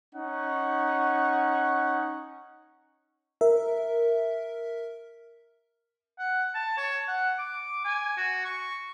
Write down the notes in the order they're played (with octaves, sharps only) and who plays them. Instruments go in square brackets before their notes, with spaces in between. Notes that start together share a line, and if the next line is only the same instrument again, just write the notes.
[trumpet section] C#4 D#4 F#5 C#6
[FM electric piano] A#4 E5
[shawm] F#5
A5
C#5
F#5
D6
G#5
F#4
C#6